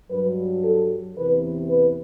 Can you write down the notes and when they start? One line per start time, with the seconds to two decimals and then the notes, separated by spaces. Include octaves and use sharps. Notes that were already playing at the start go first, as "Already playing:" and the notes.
0.10 G2 F#3 B4
0.64 A4
1.16 E2 C3 E3 B4
1.70 B4